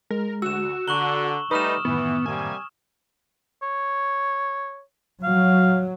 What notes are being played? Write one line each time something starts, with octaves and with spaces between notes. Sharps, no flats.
G#3 A#4
D2 F#4 E6 E7
D3 A#5 C#6 F#6 F#7 G7
G3 A3 D#4 B4 B5 D#6 F6 E7
F#2 A2 D#3 E3 B3
C3 G3 A#3 G#5
C#5
F#3 F5